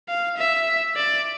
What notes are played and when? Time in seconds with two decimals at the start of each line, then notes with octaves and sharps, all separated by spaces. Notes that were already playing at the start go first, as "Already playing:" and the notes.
0.08 F5
0.38 E5
0.96 D5